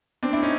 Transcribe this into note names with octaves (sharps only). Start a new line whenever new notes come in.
C4 D4
D4 E4
C#4 D#4